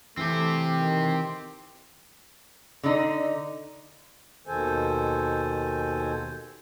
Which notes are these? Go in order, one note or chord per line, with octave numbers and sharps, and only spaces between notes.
E3 A3 C4 G4 A4
D#3
D3 D#4
D#2 B2 D#3 A4 C5 G#5